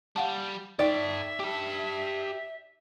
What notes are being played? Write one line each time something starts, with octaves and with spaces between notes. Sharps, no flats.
G3 F5 F#5 A5
D#4 A4 D5 E5 G5
G4 A5